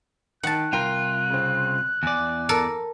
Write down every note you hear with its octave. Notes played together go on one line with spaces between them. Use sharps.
D#3 F#5 A5 F#6
C2 F4 A#4 G5
C#3 C4
E2 D5 G#5
A4 A#4 A5